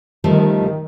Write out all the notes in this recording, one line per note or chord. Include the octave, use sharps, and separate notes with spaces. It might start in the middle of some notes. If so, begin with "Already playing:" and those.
D#3 F3 G3 A3